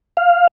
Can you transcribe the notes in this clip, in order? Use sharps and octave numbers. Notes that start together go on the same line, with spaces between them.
F5